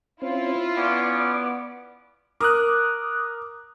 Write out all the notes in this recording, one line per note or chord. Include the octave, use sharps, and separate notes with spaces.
C4 C#4 E4 F4
B3 C#4 D5 D6
A#4 D6 D#6 F#6